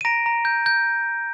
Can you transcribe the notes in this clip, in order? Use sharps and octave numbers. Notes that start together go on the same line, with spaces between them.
D#7
A#5 A#6 D7
A#5
G6
G6